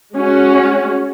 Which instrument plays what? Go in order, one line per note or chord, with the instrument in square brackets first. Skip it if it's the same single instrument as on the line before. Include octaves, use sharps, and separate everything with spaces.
[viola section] G#3 C#4 F#4